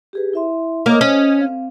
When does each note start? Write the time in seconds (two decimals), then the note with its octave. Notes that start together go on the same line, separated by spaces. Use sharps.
0.13 G4 G#4 B4
0.33 E4 E5 C6
0.86 A#3 C#5 D#5 D#6
1.01 C#4
1.39 C4 F5